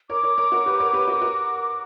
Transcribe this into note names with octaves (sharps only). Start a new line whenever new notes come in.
A#4 C#5 D6
A#4 C#5
A#4 C#5
F#4 A#4
G4 B4
A#4 C#5
G4 B4
F#4 A#4
F#4 A#4